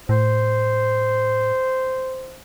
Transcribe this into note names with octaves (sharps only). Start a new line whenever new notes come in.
A2 C5